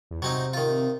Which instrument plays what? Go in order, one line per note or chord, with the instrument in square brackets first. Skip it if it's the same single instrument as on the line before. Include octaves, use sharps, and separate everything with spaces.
[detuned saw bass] E2
[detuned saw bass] C3 [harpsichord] F#3 C4 D#4
[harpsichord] D#3 F4